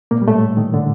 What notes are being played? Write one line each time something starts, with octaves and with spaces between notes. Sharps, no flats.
A#2 A#3
G3
A2 A3
D#3
D3